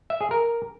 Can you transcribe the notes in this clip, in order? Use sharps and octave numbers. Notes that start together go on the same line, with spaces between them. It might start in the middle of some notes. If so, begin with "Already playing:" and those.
E5
G#4
A#4